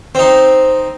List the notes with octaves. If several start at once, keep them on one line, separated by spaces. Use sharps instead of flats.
C4 D#4 C5